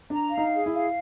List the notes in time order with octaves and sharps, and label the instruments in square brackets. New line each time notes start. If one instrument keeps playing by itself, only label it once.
[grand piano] D4 [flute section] A#5
[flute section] F5
[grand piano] D#4
[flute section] G#4
[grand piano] E4
[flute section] F5